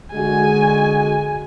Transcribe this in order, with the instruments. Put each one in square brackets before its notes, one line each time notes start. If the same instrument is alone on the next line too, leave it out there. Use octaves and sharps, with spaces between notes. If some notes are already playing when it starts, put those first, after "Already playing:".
[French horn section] D3 G#3 F#4 [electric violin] G#5